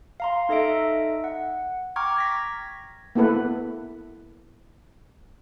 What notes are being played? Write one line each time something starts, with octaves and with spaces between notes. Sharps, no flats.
F5 A#5 C6
D#4 A4 D#5 E5 D7
F#5
G5 A#5 C#6 D6 F6 G#6
G#6 A#6 B6
A#3 B3 E4 A4 B4